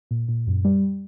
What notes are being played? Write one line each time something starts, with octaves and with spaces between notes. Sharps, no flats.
A#2
A#2
F#2
G3